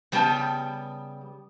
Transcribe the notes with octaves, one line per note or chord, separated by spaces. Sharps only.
C#3 G3 B3 G4 G5 A5